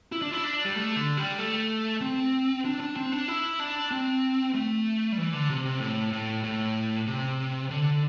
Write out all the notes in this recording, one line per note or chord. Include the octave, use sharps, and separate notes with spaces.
E4
D4
E4
D4
G3
A3
D3
G3
A3
C4
D4
D4
C4
D4
E4
D4
C4
A3
G3
E3
D3
C3
C3
A2
A2
A2
C3
D3